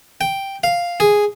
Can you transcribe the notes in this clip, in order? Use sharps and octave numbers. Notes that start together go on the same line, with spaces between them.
G5
F5
G#4